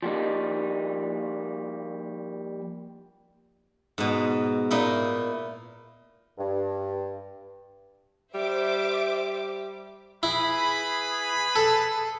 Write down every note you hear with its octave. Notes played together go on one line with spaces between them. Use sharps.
F3 G3 A#3 D#4
G#2 B2
A#2 D#4 E4
G2
G3 C5 E5 D6
E4 G#4 B4 B5
A4